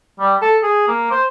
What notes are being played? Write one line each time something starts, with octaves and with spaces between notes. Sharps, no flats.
G3
A4
G#4
A#3
C5